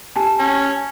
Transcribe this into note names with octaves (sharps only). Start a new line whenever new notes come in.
G4 G#5 A5
C#4